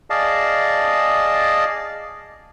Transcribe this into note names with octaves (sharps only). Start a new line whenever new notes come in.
G#4 D5 D#5 F5 A5